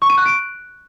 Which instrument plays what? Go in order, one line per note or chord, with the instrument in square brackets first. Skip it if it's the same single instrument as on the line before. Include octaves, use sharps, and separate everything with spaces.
[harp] C#6
D#7
F#6
D7